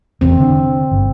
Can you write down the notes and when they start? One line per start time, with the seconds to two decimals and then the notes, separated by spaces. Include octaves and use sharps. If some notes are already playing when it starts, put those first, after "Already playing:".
0.21 E1 E2 C4
0.40 D3 D4
0.91 G1